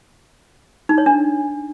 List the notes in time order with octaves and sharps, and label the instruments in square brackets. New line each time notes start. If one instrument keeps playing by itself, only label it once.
[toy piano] D#4
C#5
D4